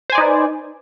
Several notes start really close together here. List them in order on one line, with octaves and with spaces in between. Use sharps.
C5 G#5 D5 D#4 B4